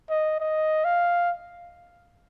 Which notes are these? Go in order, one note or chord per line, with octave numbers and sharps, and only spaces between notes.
D#5
D#5
F5